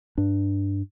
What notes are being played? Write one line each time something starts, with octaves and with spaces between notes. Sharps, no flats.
G2 D4